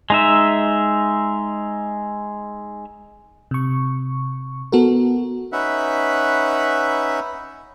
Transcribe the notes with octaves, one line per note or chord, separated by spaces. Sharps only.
G#3 D#4 E5
C3 C#6
B3 F#4 A4 A#4
C#4 D#4 B4 E5 F#5